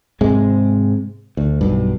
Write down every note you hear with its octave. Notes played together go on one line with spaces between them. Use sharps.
G#2 C3 G#3
D2
B1 G2